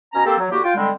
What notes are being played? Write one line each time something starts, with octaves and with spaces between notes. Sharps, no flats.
B2 C#4 A#5
A#3 C4 G4 A4
F#3
A2 D3 A#3 F#4 G4
F4 G5
D3 G3 G#3 C4